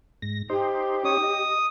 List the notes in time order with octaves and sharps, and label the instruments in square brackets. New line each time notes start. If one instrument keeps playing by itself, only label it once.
[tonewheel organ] G#2 A#6
[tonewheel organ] D#4 C5 [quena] G4
[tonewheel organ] C#4 D#4 C#5 [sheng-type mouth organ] D#6
[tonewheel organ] D#5